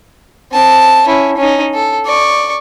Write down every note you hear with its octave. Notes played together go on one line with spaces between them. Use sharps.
C4 A5
C#4 E4
C#4 D#4
A4
D5 C#6